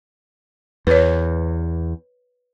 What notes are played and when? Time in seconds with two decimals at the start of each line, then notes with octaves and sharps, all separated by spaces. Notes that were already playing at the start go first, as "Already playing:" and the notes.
0.87 E2 B4 C#5